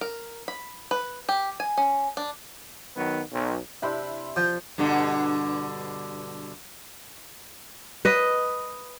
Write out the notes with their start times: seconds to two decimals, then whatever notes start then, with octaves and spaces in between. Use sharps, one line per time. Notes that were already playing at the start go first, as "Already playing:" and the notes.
0.01 A#4
0.48 B5
0.91 B4
1.29 G4
1.60 G#5
1.77 C#4
2.17 D4
2.95 D#3 F#3 B3
3.32 B1
3.82 C3 D4 E4 G4 B5 C6
4.36 F3 G6
4.78 G2 B2 D3
8.05 B4 D#5